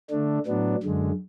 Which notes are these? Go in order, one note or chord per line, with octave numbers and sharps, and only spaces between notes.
D3 A3 D4
A2 F#3 B3 D4
F#2 D3 G#3